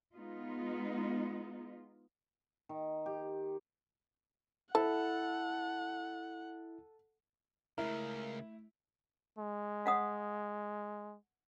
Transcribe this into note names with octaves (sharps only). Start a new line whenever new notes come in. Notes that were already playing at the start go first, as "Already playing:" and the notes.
G#3 B3 D#4 F4
D#3
G4
E4 A4 F#5 A5
C#2 C#3 A3 E4 A#4
G#3
F5 F#5 D#6